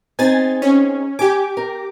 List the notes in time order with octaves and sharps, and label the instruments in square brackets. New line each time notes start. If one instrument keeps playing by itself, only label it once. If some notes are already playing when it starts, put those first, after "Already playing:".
[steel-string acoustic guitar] C4 D#4 G#4 [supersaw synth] G#5 A6
[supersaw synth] C#4
[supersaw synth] G4 D6 [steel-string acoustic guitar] G#5
[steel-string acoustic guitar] A#4